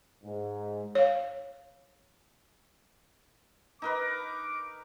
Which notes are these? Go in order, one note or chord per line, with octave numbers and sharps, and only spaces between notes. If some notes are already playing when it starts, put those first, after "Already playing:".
G#2
C#5 F5
D#4 A#4 B4 D6